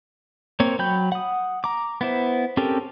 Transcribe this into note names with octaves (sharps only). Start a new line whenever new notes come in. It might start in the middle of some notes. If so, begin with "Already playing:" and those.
A#3 C4 C#5
F#3 G5 B5 G6
F#5 D#6
A#5 D6
B3 E4 C5
C4 C#4 G4 A4 A#4